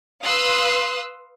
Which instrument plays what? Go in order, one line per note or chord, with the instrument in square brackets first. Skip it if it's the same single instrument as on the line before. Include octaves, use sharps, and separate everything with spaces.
[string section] B4 F5 C6 D#6 E6 F#6